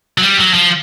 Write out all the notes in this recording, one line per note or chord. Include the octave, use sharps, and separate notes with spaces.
F#3
G3
F#3
F3